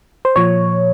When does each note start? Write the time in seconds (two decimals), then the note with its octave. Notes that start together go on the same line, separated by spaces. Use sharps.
0.25 C5
0.36 A#2 F3 C#5